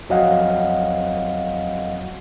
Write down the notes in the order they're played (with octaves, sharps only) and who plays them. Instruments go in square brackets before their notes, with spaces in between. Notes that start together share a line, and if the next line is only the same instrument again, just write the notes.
[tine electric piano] F2 F#3 C4 D#5 F5 F#5